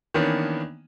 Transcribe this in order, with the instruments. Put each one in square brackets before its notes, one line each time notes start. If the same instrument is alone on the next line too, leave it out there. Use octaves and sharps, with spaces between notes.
[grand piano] D#3 E3 A#3 B3 C#4 D4